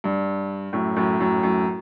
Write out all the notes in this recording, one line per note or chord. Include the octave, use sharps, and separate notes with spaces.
G2
F#2 A2
F#2 A2
F#2 A2
F#2 A2